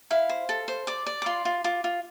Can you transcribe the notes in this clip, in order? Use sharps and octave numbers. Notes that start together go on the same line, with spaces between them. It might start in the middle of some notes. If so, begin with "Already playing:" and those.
E4 F5
C5
A4
C5
D5 D6
D5
D6
F4 C6
F4
F4 D6
F4